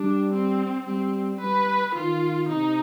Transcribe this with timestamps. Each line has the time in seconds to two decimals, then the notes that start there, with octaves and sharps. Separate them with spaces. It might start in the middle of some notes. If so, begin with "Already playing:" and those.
Already playing: G3 D4
0.33 C4
0.86 G3 C4
1.40 G3 B4
1.95 D#3 F4
2.49 C3 D#4